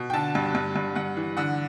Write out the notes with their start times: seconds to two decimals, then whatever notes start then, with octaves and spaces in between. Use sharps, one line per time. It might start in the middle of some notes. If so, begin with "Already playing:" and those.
Already playing: B2
0.10 G5
0.13 D3 A5
0.35 G2
0.55 G2
0.76 G2
0.95 G2 F#5
1.17 E3
1.37 D3 F#5